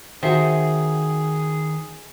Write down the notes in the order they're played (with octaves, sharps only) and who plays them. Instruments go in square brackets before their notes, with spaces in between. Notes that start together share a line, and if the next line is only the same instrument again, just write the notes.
[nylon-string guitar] D#3 F#4 [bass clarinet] G#4 [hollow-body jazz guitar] C5 E5 G5